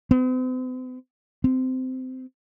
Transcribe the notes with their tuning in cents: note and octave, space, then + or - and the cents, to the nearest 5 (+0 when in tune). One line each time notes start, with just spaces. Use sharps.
C4 -45
C4 -20